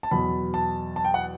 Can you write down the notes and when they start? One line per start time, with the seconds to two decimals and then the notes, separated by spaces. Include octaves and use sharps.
0.03 A5
0.11 E2 B2 F#3 B5
0.54 A5
0.96 A5
1.05 G5
1.14 F#5